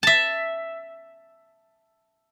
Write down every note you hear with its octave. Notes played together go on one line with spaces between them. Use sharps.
E5 A5